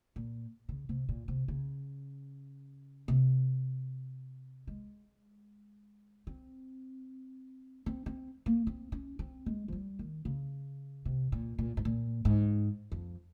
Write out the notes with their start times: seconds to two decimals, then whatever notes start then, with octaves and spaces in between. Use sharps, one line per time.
0.16 A#2
0.69 C#3
0.89 C3
1.09 A#2
1.28 C3
1.48 C#3
3.08 C3
4.67 G#3
6.27 C4
7.86 C4
8.06 C4
8.46 A#3
8.67 C4
8.92 C#4
9.19 C4
9.46 G#3
9.68 F3
9.73 G3
9.99 D#3
10.25 C#3
11.05 C3
11.32 A#2
11.58 A#2
11.77 G#2
11.85 A#2
12.25 G#2
12.92 F2